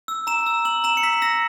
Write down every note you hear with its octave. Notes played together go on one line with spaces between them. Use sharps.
E6
A#5 E7
E6
E6 F#7
A#5 E7
C#7
E6 B6
E6 A#6